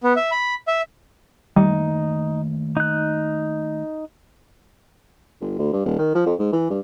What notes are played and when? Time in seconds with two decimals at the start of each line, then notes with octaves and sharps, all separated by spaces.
0.03 B3
0.16 E5
0.31 B5
0.68 E5
1.56 D#3 G3 A3 A#3 D#4
2.77 D#4 F#6
5.41 G1
5.58 D2
5.73 G2
5.85 D#1
5.99 D#3
6.15 F3
6.26 F2
6.39 G#2
6.53 E3
6.70 G2